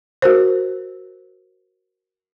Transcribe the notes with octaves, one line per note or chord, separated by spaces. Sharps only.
F#4 A#4 C5